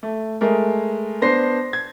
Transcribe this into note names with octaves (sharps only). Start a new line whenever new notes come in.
A3
G#3 A3 A#4
B3 D4 C5 A#6 C7
G#6